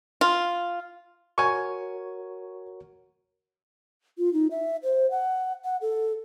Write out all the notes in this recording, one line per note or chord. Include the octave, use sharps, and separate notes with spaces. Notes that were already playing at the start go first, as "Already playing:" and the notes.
F4
F#4 A#4 C#5 G#5 C#6
F4
D#4
E5
C5
F#5
F#5
A4